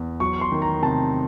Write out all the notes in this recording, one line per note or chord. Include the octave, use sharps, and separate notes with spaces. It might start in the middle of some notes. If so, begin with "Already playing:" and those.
Already playing: E2
F#3 C#6
C6
D#3
A#5
C3 A5